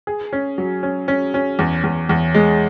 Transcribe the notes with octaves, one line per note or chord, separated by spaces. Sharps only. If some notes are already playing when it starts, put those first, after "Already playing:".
G#4
C#4
F#3
C#4
C#4
C#4
E2
E2
E2
G#3